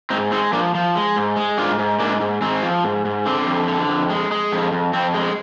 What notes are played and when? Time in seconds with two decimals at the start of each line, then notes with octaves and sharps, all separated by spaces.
0.10 G#2 C4 D#4
0.32 G#3 C4 D#4
0.52 F3 A#3 D4
0.75 F3
0.95 G#3
1.16 G#2
1.36 G#3
1.58 G#2 D4 F4
1.79 G#2
2.00 G#2 A#3 D4
2.21 G#2
2.41 G#2 C4
2.62 F3
2.84 G#2
3.05 G#2
3.26 D3 C4
3.47 F2
3.68 D3
3.89 F2
4.10 G#3
4.32 G#3
4.52 F2
4.73 F2
4.93 F2 C4
5.14 G#3